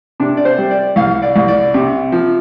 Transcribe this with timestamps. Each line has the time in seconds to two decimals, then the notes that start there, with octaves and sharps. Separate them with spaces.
0.20 C3 D4
0.37 D5
0.45 C5
0.58 G3
0.71 D5
0.96 C2 F5
1.22 D5
1.36 C2
1.48 D5
1.74 C3
2.12 F3